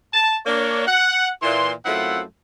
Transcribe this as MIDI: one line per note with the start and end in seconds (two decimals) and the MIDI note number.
0.14 0.35 81
0.46 0.85 58
0.46 0.85 62
0.46 0.85 73
0.87 1.29 78
1.43 1.71 46
1.43 1.71 52
1.43 1.71 84
1.86 2.22 42
1.86 2.22 57
1.86 2.22 60
1.86 2.22 64
1.86 2.22 65
1.86 2.22 78